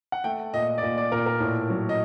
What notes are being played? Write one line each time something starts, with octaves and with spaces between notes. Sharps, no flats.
F#5
A3 G5
A#2 D#5
D#5
D5
A#2 D#5
D5
A#2 A#4
A#4
A2
F#3
D#5